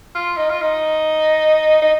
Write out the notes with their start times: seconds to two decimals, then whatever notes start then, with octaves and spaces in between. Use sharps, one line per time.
0.15 F4
0.37 D#4
0.49 F4
0.61 D#4
1.82 D#4